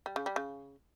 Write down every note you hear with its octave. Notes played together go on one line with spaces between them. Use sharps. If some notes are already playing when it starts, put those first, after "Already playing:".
G3
C#3
G3
C#3